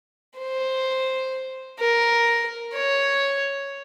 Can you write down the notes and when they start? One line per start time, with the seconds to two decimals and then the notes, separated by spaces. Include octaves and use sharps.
0.38 C5
1.80 A#4
2.74 C#5